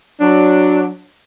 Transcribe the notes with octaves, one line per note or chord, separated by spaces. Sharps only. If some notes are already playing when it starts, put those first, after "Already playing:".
F#3 D4